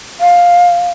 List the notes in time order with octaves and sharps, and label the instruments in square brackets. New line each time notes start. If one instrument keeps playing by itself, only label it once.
[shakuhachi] F5